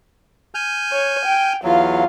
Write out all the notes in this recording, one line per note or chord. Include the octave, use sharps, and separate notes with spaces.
G#5 F6 G6
C#5
G5
E2 F#3 F4 F5